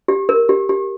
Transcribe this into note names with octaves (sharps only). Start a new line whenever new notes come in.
G4
A#4
G4
G4